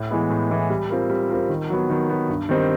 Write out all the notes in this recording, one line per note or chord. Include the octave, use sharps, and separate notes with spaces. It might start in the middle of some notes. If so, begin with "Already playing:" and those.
Already playing: A2
E3 G#3 B3
A2
E3 G#3 B3
G3
C4 F4 A#4
G3
C4 F4 A#4
D#3
F#3 B3
D#3
F#3 B3
G2
D#3 G3 C4 D#4